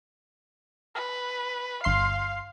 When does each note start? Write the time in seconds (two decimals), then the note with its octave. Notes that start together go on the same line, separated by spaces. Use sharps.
0.95 B4
1.84 G1 F5 C6 C7